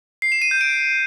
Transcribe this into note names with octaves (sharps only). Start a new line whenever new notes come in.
C7
E7
D#7
G6
D7